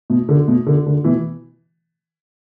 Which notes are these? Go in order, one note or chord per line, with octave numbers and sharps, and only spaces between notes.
B2
D3
B2
D3
D3
B2 E3